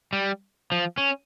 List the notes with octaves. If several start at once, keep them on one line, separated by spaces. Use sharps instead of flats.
G3
F3
C#4